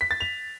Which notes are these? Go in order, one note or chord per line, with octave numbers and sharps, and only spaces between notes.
B6
A6
F7